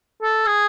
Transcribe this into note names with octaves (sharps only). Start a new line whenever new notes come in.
A4
G#4